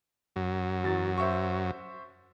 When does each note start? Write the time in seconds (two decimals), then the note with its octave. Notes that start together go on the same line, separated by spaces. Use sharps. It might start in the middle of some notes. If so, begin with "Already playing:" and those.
0.36 F#2
0.83 E2 F#3 A6
1.17 C5 E5 C#6